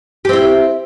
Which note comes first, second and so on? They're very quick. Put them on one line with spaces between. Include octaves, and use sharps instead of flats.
G4 C4 E4